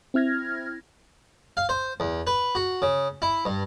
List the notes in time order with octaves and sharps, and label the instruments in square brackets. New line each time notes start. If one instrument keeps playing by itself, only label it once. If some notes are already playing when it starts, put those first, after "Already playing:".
[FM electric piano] C4 E4 F6 G#6 A#6
[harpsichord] F5
C5
E2
B4
F#4
C#3
E4
G2